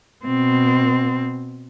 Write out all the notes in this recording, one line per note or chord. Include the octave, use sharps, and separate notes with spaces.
B2 C4